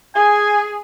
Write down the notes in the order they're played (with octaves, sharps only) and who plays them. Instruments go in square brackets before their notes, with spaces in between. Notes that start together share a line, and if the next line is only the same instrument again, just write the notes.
[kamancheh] G#4 [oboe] G#5